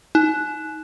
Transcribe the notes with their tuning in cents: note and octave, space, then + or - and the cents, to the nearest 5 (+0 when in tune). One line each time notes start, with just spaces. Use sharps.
D#4 +20